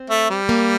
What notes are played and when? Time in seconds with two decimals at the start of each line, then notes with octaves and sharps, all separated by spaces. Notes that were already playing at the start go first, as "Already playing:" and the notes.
Already playing: C4
0.10 A3
0.30 G3
0.49 A#3